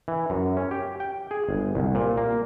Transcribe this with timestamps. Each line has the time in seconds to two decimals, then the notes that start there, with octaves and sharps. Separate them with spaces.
0.08 E3
0.30 F#2
0.57 C#4
0.71 G4
1.00 G5
1.31 G#4
1.49 G1
1.75 C2
1.95 A#2
2.17 A#3